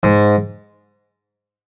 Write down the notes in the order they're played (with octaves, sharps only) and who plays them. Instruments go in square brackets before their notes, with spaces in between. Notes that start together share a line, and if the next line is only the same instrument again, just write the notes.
[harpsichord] G#2